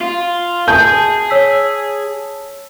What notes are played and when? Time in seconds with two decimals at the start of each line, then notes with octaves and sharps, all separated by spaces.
0.01 F4
0.68 G#4 G#5 A5 G6
1.30 C#5 E6 B6